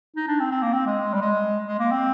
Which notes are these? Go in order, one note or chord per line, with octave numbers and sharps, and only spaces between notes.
D#4
D4
C4
C4
A#3
C4
G#3
G3
G#3
G#3
A#3
C4